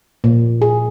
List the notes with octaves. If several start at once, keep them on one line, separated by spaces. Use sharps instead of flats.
A#2
G#4